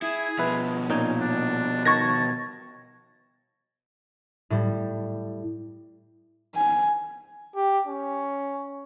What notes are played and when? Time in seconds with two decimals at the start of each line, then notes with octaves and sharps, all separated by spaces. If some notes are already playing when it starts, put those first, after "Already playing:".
0.02 E4 G#4
0.39 B2 F3 B4 E5
0.90 A#2 C#4 D#4 G#5
1.20 D4
1.85 D#3 A5 C#6 G#6 A#6
4.50 A2 G3
6.56 G#5
7.56 G4
7.87 C#4